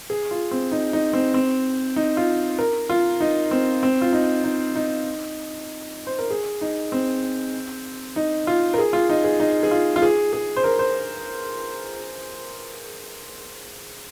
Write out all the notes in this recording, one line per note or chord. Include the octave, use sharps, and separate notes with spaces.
G#4
F4
C4
D#4
D#4
C4
C4
D#4
F4
A#4
F4
D#4
C4
C4
F4
D#4
D#4
D#4
C5
A#4
G#4
D#4
C4
D#4
F4
A#4
G#4
F4
D#4
G#4
D#4
G#4
F4
F4
G#4
G#4
C5
A#4
C5